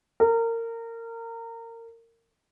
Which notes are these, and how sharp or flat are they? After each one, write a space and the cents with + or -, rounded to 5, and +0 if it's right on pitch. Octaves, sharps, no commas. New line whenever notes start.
A#4 -25